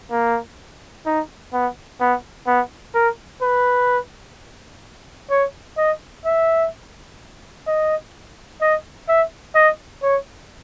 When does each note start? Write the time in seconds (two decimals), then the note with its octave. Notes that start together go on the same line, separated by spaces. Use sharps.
0.11 A#3
1.06 D#4
1.53 B3
2.00 B3
2.47 B3
2.94 A#4
3.41 B4
5.30 C#5
5.77 D#5
6.25 E5
7.67 D#5
8.61 D#5
9.08 E5
9.55 D#5
10.02 C#5